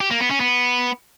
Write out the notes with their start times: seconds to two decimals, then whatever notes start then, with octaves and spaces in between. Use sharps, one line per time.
0.01 G4
0.10 A#3
0.20 B3
0.30 C#4
0.40 B3